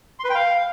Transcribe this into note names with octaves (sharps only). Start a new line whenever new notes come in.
C6
B4
G5
F5